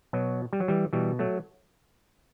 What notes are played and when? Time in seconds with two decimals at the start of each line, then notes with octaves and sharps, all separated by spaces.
0.13 B2 F#3
0.53 G3
0.60 F#3
0.68 E3 G3
0.93 B2 E3 G3
1.19 F#3 A3